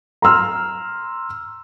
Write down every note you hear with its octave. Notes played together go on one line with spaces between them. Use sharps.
A#5 C6 E6 F6